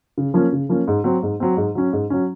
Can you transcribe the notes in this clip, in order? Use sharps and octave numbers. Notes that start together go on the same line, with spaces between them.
C#3
F3 A#3 C#4
C#3
F3 A#3 C#4
G#2
F#3 C4
G#2
F#3 C4
G#2
F#3 C#4
G#2
F#3 C#4